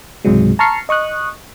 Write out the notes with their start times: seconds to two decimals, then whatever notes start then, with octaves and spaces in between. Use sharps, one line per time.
0.25 C#2 G#2 C3 F#3 G#3
0.59 A5 A#5 C#6 F6 C7 C#7
0.89 D#5 C#6 D#6 F#6